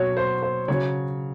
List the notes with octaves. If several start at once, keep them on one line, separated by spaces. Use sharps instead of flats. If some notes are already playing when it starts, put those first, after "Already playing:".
Already playing: B2 F#3 C#5
C5
C5
C#3 F#3 C#5